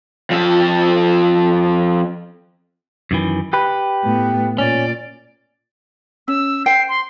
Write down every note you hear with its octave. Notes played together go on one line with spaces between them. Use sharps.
F2 A4
F#2 D#3 E3
G4 B4
A2 B3
A#2 C#4 D5
C#4 E6
C5 G5 C7
C6